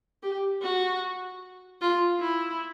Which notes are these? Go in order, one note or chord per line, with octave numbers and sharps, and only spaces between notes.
G4
F#4
F4
E4